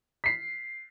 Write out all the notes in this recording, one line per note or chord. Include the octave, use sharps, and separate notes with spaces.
B6 C7